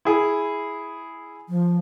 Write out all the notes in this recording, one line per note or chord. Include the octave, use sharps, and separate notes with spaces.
E4 G#4
F3